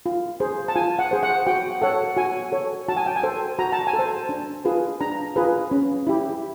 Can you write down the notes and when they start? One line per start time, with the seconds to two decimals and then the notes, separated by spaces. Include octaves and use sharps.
0.06 F4
0.40 G#4 C5
0.68 A5
0.76 F4 G#5
0.99 F#5
1.11 G#4 C5
1.23 F#5
1.47 F#4 G5
1.82 A4 C#5 F#5
2.17 F#4 G#5
2.52 A4 C#5
2.88 F#4 A5
2.97 G#5
3.06 G5
3.16 G#5
3.23 A4 C5
3.59 F#4 A#5
3.72 A5
3.87 G#5
3.93 A4
3.99 C5 A5
4.29 D4
4.65 F4 G#4 B4
5.01 D4 A#5
5.36 F4 G#4 B4
5.71 C#4
6.07 E4 G4